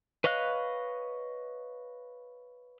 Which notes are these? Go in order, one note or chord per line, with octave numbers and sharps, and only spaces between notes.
B4 C#5 D#5 F5 F#6